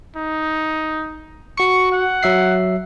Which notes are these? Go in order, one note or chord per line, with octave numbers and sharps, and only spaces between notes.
D#4
F#4 C#6 C#7
F#5
F#3 E5 C7